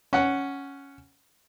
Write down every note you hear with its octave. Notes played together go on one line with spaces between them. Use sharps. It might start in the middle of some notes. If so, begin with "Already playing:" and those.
C#4 F#5